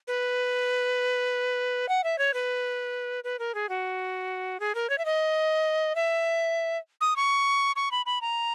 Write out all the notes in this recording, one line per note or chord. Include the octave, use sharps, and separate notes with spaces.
B4
F#5
E5
C#5
B4
B4
A#4
G#4
F#4
G#4
A#4
C#5
E5
D#5
E5
D#6
C#6
C#6
B5
B5
A#5